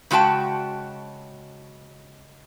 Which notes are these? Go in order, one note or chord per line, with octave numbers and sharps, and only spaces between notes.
C#3 G#3 F#4 G5 A5